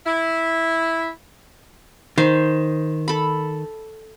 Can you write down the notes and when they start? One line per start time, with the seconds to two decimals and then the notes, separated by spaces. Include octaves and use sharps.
0.06 E4
2.18 D#3 C5
3.08 A4 B5